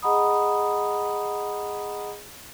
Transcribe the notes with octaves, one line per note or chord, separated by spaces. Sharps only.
G#4 D#5 F#5 A#5 B5 D#6